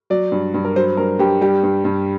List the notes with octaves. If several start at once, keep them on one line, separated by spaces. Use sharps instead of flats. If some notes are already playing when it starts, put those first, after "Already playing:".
F#3 D5
G2
G2
A#4
F#3 C5
G2 A#4
G2 G4
G3 G4
G2
G2